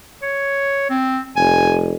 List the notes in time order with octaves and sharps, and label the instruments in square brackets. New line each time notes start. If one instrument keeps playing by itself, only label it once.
[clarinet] C#5
C4
[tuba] F1 [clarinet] G#5